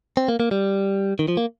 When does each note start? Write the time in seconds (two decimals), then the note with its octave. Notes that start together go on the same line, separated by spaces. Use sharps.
0.17 C4
0.28 A#3
0.40 A#3
0.51 G3
1.19 D#3
1.28 F3
1.37 A#3